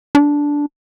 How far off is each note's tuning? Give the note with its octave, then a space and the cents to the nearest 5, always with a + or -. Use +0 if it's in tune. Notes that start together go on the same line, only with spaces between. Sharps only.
D4 -10